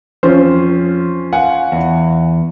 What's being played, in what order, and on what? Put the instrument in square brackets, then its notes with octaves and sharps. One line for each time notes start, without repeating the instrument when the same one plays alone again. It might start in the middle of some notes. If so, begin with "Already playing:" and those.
[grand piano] F2 [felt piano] C#4 F4 C5
[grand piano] F5 F#5 G#5
[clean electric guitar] E2